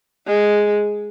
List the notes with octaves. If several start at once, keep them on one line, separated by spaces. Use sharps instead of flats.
G#3